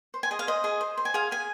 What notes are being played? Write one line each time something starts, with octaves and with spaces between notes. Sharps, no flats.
C5
G#5
G#4 D#5
F5
C5 D#5
G#4
C5
C5
G#5
G#4 F5
G#4 G#5